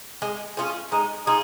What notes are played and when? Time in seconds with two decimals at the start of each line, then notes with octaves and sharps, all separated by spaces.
0.22 G#3
0.57 C#4 F4 G#4
0.92 G#3 D#4
1.26 D#4 F4 G#4